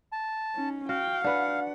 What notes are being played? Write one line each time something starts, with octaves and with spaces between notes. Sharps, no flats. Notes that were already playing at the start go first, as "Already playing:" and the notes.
A5
C#4 D#4
F#4 F5 G5
D4 B4 F#5